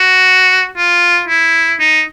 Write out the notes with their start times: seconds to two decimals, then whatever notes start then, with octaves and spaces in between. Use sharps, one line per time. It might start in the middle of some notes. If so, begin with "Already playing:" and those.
Already playing: F#4
0.77 F4
1.28 E4
1.80 D#4